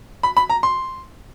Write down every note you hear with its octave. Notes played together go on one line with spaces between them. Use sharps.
B5
B5
A#5
C6